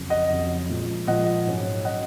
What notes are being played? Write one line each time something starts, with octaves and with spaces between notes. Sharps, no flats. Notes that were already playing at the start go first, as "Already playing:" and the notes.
Already playing: F2 C#3 F#3
D#5 F#5
F2 C#3 F#3
A#2 F3 G#3
A#2 F3 G#3 D#5 F#5
G#2 F#3 C#4
F#3 C#4 D#5 F#5